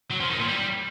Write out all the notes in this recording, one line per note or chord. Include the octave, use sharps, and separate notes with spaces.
F#3
F3
D#3
A#2
G3